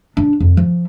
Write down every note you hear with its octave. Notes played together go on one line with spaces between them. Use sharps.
D4
F2
F3